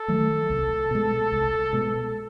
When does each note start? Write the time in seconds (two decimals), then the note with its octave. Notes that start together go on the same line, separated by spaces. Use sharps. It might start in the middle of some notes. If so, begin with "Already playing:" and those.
Already playing: A4
0.08 D#3 F#3 A3
0.50 C2
0.91 B2 G#3
1.32 C2
1.73 B2 G#3